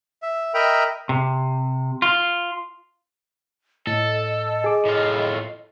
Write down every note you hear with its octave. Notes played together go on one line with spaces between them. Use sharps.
E5
A#4 D#5 E5 G5 A#5 B5
C3
F4
A2 A4 D#5
G#4 D6
A2 F4